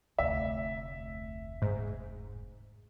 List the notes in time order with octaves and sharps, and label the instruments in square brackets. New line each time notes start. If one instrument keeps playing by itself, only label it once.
[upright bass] F1 D2 [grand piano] E5
[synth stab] G#2